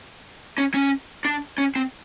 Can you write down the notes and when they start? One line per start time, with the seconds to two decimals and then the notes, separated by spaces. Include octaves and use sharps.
0.58 C#4
0.74 C#4
1.25 D4
1.58 C#4
1.76 C4